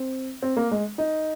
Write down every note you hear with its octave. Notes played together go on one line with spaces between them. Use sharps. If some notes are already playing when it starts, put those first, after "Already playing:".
Already playing: C4
C4
A#3
G#3
D#4